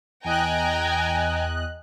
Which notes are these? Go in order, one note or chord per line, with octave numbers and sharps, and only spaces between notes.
E2 D#5 G5 G#5 A#5 F#6